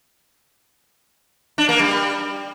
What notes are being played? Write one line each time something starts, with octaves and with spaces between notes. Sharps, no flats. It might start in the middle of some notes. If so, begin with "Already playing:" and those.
D4
A#3
G3